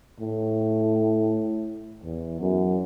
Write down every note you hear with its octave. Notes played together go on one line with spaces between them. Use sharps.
A2
E2
F#2